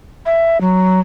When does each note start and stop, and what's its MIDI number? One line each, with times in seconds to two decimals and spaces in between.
0.26 0.60 76
0.61 1.00 54